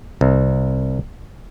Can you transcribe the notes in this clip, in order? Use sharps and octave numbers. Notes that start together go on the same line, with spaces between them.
C2